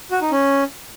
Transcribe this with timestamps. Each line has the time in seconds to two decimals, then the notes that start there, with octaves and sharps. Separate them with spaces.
0.11 F#4
0.21 D#4
0.32 C#4